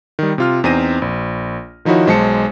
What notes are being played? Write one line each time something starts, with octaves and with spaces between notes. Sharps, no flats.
D#3 G3
C3 F4 F6
E2 C4 D#4 C5 A#6 D#7
A#1
D#3 F3 D#4 E4 F#4 C#5
B1 G#3 C5 A5 C#7